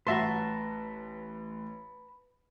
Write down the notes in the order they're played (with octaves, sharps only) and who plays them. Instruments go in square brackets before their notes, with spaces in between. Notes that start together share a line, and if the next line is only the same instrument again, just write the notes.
[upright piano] A1 [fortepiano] F#4 E5 C6 [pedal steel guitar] B4 A5 A#5